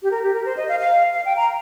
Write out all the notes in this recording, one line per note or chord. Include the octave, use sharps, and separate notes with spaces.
G4
A#4
G4
A#4
C5
D#5
F5
F5
F5
G5
A#5